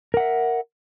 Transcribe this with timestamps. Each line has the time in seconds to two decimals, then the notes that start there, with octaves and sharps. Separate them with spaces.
0.14 A#4
0.17 F#5
0.20 E5